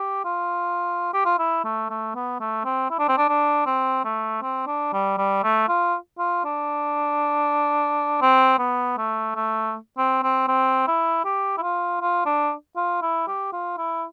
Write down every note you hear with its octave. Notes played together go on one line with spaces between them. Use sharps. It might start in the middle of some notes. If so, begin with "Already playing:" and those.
Already playing: G4
F4
G4
F4
E4
A3
A3
B3
A3
C4
E4
D4
C4
D4
D4
C4
A3
C4
D4
G3
G3
A3
F4
F4
D4
C4
B3
A3
A3
C4
C4
C4
E4
G4
E4
F4
F4
D4
F4
E4
G4
F4
E4